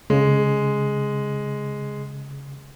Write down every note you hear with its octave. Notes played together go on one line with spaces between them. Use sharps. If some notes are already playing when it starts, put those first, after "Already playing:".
C#3 G#3